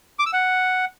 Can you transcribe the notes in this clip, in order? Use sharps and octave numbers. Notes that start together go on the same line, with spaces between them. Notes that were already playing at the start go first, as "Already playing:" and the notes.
D6
E6
F#5